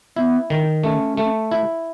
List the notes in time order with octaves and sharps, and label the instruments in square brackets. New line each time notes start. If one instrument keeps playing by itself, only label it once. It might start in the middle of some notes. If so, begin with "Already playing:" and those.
[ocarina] B3 [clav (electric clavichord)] E4
[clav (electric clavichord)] D#3
[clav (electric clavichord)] A3 [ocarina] C#4
[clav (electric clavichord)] A3
E4